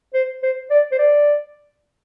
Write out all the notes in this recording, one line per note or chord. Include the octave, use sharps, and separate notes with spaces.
C5
C5
D5
C5
D5